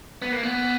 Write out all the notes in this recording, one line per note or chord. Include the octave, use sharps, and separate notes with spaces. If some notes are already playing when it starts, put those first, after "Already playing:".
B3
A#3
B3